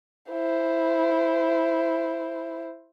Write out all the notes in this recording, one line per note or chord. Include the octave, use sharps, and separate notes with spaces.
E4 C5